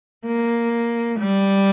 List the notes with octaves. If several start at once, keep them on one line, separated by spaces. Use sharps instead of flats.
A#3
G3